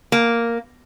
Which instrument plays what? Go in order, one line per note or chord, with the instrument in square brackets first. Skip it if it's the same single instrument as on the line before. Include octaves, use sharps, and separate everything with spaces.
[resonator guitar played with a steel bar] A#3